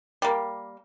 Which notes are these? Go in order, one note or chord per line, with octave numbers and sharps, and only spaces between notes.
G3 A#3